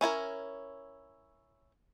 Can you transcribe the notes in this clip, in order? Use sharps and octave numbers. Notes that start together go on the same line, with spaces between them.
C#4 E4 F4 A#4